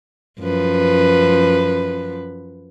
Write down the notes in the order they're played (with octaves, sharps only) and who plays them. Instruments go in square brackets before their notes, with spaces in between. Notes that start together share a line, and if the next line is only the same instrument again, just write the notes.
[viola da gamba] F#2 F3 B4